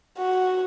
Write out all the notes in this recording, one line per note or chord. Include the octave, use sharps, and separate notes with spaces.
F#4